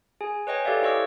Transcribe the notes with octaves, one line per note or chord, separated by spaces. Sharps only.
G#4 G#5
B4 C#5 D#5 G5 G#5
G4 A4 B4 D5 E5 F5
E4 C5 C#5 D#5 C#6 E6